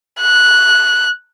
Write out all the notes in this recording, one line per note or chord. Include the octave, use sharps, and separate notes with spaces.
F#6